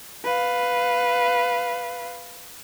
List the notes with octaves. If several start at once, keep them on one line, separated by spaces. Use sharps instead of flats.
B4 F5